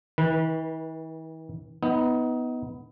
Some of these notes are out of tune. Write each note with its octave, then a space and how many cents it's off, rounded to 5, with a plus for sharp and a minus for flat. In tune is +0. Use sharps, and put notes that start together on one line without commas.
E3 -45 B4 -20
B3 +5 D#4 +25